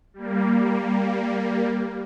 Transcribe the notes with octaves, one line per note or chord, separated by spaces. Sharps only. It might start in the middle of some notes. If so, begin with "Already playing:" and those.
G3 A#3